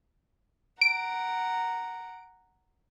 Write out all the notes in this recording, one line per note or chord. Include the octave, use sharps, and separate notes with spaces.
F#5 A#5 D7